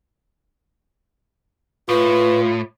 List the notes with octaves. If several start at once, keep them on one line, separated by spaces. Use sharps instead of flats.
A2 F4 B4